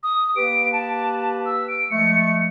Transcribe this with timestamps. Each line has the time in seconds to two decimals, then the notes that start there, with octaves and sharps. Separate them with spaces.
0.03 D#6
0.36 A#3 G4 B4 D7
0.72 A5
1.46 E6
1.69 D7
1.90 F3 G#3 A3 C#7